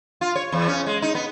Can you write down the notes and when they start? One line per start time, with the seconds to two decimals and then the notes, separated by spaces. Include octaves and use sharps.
0.21 F4
0.36 C#5
0.52 E2
0.68 C#4
0.86 G#3
1.02 D#4
1.15 B3